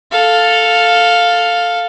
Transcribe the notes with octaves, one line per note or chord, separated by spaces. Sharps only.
A4 F5